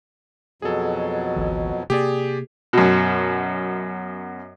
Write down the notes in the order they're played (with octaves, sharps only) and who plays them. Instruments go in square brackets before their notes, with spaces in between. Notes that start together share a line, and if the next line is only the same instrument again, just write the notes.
[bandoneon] F2 B2 F#3 [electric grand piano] G#4 A4
[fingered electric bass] G#1 D2 E3
[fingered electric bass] C3 A#3 [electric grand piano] G4 G#4 D5
[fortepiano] F#2 B2